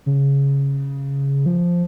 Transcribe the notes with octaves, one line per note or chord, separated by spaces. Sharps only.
C#3
F3